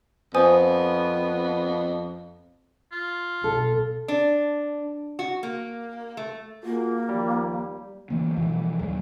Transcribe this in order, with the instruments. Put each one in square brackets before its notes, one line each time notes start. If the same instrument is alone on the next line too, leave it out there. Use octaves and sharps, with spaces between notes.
[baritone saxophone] F2 [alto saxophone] B3 [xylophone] C5 G#5 D#6
[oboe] F4
[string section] B1 [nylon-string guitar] A4
[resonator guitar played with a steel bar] D4
F#4
A#3
A3
[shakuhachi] A#3 [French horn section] F4 F#4 G#4
[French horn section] D#2 F3 [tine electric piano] G3
[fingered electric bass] E3 A3 A#3
B2 E3 F3 G3
D#2 F#3 G#3